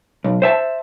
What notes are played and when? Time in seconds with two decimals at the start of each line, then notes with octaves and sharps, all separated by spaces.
0.24 B1
0.42 C5 E5 A5